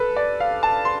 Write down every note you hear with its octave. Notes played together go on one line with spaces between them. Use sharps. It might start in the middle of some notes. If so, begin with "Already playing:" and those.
Already playing: A4 B4
D5
F5
A5
C6